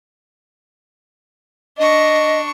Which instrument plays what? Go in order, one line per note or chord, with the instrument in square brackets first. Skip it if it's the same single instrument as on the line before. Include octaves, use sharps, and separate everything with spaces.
[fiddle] D4 C#6 [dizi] D#5